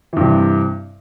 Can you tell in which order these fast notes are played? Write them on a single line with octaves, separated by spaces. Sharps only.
E3 G2 C3